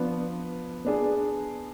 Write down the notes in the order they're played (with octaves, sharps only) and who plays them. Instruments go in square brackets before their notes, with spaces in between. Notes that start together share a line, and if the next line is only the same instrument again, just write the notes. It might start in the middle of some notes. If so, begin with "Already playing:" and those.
Already playing: [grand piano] F3 B3 D4
B3 D4 G#4